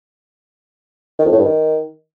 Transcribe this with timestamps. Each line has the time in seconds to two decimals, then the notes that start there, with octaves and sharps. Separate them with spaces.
1.19 D#3
1.25 F2
1.32 A2
1.38 G2
1.45 D#3